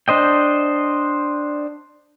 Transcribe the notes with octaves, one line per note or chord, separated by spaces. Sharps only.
D4 C5 D#5 G5